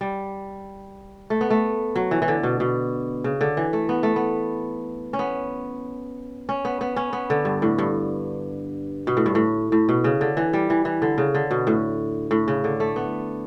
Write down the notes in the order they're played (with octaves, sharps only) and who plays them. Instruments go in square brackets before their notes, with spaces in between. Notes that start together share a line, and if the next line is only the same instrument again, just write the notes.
[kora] G3
A3
B3
A3
F#3
E3
E3
D3
B2
B2
C#3
D3
E3
A3
B3
A3
B3
C#4
B3
C#4
B3
B3
C#4
B3
D3
G2
A2
G2
B2
A2
G2
A2
A2
B2
C#3
D3
E3
G3
E3
E3
D3
C#3
D3
B2
A2
A2
C#3
D3
A3
B3